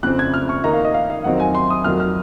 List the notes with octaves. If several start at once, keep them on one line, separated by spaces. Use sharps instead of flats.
F2 C#3 F3 C4 F#6
G#6
F6
C#6
D#3 A#3 D#4 A#5
F5
D#5
F5
F5
F2 D#3 F#3 C4 D#4 F#5
G#5
C6
D#6
F2 D#3 F#3 F6
F6